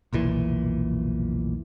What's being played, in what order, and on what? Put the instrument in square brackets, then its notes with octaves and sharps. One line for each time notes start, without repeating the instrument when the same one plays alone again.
[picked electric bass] F1 B1 A#2 E3